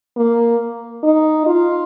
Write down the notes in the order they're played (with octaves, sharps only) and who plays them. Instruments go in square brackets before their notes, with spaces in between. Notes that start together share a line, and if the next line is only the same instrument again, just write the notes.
[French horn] A#3
D#4
F4